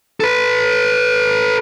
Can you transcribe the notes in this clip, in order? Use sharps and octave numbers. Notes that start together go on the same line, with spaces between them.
A4 B4